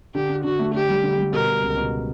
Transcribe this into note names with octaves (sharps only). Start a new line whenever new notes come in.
D3 G4
D4
D3 F#4
A3
D3 G4
G3
D3
G3
B2 A#4
B2
C#2
B2